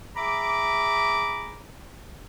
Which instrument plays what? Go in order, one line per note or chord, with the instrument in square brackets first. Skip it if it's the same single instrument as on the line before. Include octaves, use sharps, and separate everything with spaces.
[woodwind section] G#4 E5 A#5 B5 D6